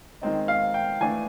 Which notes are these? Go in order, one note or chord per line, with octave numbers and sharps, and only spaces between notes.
D#3 G#3 C4 D#4
F5
G5
E3 A3 D4 G#5